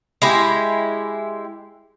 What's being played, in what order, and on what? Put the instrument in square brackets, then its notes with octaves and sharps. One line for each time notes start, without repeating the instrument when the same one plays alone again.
[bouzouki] G#3 E4 G4